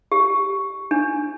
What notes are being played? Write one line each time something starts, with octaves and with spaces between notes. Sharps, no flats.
G4
D4